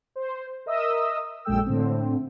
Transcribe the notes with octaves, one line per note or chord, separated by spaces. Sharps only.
C5
A#4 D#5 E5 D#6 E6
A#1 F#2 G#3 A4 G5 E6
A2 D3 C4